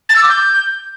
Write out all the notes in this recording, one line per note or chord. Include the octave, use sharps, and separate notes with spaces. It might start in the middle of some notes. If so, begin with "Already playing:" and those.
A6
E6
D6
G6